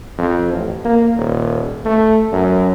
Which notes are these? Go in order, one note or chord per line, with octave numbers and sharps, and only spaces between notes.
F2
A1
A#3
D#1
A3
F#2